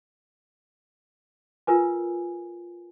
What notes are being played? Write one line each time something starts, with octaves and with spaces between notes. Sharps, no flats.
F4 A#4 B4 G#5